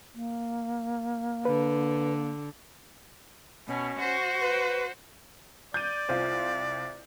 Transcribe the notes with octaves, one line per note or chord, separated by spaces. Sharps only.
A#3
D3 B4
B2 C#4
F#4 C5
B4
D5 G6 D#7
C2 F4 C5